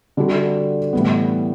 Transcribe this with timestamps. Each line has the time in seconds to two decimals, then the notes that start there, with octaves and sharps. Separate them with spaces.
0.17 D3 G3 D4 F#4 A4
0.93 A2 E3 G3 B3